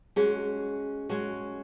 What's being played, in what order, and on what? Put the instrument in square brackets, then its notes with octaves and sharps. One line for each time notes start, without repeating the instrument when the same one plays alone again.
[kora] G#3 C#4 F#4 [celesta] G#4
[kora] G#3 C#4 F#4